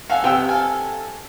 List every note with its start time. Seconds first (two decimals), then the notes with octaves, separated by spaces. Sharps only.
0.10 F#4 A4 F5 G#5
0.24 C3 B3 F4 G5 E6
0.49 A4 F5 G#5